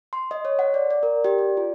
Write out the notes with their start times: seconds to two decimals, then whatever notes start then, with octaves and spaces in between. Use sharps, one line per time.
0.13 C6
0.31 D#5
0.45 C#5
0.59 F#5
0.74 D5
0.91 D5
1.03 A#4
1.25 G4
1.38 D5
1.57 F4